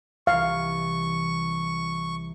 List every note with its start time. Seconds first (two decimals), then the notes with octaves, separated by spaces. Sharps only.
0.27 C2 E3 F5 C#6